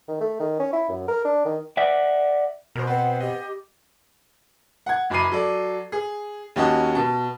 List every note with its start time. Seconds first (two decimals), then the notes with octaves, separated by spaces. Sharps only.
0.08 D#3
0.20 A3
0.40 D#3
0.59 C#4
0.73 E4
0.89 F#2
1.08 A#4
1.25 D4
1.45 D#3
1.77 D5 E5 F#5
2.76 B2 F#4 A#4 C5
2.87 B3 C4 B4 C5 F#5
3.20 G4 D#5
4.86 F#5 G#6
5.10 F#1 F#2 B5 D6 C7 D#7
5.32 F#3 A4 D5
5.92 G#4
6.56 D#2 C#4 F#4 D#5 A5
6.95 B2 A5